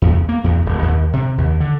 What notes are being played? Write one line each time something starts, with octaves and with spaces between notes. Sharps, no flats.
E2
A#3
E2
D#1
D#2
C3
D#2
D3